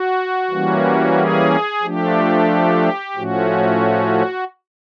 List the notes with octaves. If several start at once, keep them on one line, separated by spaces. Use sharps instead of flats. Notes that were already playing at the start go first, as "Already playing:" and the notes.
Already playing: F#4
E3 G3 A#3 C#4
G#4
F3 A3 D4 G4
A2 F3 A3 C#4 F#4